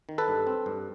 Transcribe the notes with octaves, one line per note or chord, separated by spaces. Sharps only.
D#3
A4 B4
G2
C4
G2